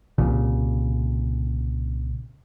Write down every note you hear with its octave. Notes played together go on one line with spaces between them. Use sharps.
C2 A#2 C#3